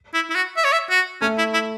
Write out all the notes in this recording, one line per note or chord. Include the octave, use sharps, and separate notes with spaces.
E4
E4
F#4
E5
C#5
E5
F#4
A3 C#4
E4
E4